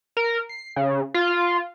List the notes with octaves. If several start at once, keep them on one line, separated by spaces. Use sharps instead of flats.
A#4
C7
C#3
F4